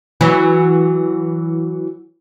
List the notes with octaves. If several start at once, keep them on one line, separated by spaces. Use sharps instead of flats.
E3 F#3